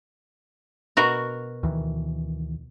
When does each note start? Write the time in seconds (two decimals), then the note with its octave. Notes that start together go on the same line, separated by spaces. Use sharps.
0.97 B2 F#4 A#4
1.63 D2 D#3 E3